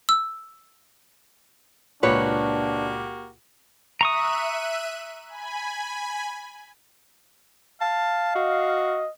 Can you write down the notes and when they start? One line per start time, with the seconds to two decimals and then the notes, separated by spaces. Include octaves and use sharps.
0.09 E6
2.03 C#2 A#2 A#3 D4 F#4 G4 B4 C#5
4.01 E5 A#5 C#6 D#6 F#6 D#7
5.28 G#5 B5
7.81 F5 A5
8.35 F#4 D#5